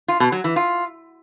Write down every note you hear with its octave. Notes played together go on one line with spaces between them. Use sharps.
F4
B2
F#3
E3
F4